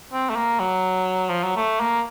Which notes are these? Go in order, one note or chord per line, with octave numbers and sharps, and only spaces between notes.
C4
A3
A#3
F#3
F3
F#3
A3
A#3